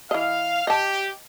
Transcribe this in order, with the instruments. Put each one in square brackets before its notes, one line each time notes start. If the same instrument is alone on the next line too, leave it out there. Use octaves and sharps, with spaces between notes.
[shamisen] E3 D#5 [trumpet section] F5
[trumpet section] G4 [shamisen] D#5 A5